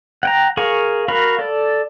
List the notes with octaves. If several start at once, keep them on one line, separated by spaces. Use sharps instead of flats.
F#5 G5 A#5
G#4 A#4 F5 C#6
F#4 A#4 F5 B5
A4 D5